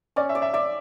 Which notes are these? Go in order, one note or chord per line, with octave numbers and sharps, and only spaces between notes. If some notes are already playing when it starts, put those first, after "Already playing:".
C#4 D5
E5
D5
E5
D5 E5